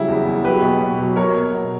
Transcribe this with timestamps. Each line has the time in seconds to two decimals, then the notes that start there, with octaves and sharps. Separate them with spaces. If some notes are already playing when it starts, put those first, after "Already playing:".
Already playing: C#3 F#3 G3 E4
0.08 E2
0.26 E2
0.44 F#3 G4 B4
0.62 B2
0.81 B2
0.99 F#3
1.16 F#3 A#4 C#5
1.34 B2
1.52 B2